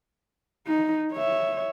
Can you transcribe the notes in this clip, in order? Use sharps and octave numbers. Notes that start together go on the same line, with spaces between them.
D#4
C#5 E5